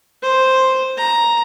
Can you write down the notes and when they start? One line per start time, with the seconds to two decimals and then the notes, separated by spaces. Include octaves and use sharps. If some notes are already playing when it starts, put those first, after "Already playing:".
0.23 C5
0.97 A#5